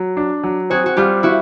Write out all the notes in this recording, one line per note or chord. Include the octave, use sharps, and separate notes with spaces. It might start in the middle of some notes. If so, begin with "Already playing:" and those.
Already playing: F#3
D4
F#3
C4 F#4 G#4
F#4
G3 F4 G4
G3 E4 F#4